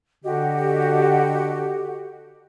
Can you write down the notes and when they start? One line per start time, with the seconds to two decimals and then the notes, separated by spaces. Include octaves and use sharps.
0.24 D3 F#4 G4 D#5